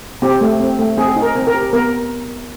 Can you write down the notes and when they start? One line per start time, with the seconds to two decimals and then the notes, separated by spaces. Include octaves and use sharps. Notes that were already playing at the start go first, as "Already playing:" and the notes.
0.22 C4 G4
0.41 A3
0.60 C4
0.79 A3
0.98 C4 G#4
1.16 D#4
1.22 A#4
1.35 C4
1.47 A#4
1.54 G4
1.73 B3 A#4